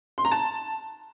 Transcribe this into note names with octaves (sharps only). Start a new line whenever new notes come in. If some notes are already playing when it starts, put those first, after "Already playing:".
C6
A#5
A5